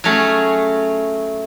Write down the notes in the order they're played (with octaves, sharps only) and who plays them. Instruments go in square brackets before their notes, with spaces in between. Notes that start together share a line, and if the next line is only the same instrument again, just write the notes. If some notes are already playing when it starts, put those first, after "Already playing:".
[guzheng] F#3 A3 C#4 G#4